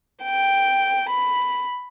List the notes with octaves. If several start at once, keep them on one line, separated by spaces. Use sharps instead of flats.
G5
B5